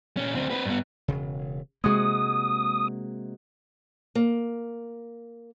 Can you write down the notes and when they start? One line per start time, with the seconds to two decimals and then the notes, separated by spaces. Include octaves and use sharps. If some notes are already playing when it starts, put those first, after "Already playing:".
0.17 A#2 C#4
0.35 D2 C4
0.51 C4 B4
0.65 G2 B3
1.08 E1 C#3
1.84 C3 G#3 A#3 F#4 G#4 D#6
4.15 A#3